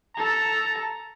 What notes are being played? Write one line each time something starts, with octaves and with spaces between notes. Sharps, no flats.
A4 A5 A#5